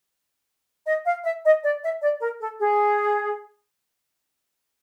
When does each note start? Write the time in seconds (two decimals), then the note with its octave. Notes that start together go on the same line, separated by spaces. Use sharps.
0.86 D#5
1.06 F5
1.24 E5
1.44 D#5
1.63 D5
1.83 E5
2.02 D5
2.21 A#4
2.40 A4
2.60 G#4